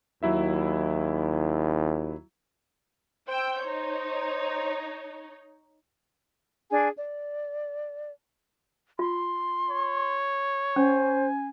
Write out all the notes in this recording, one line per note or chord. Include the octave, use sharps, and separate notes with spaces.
D#2 F#3 E4 E5
C5 G5 E6 G6
D#4 C#5
D4 G#4 G#5
D5
F4 C6
C#5
C#4 C5 G#5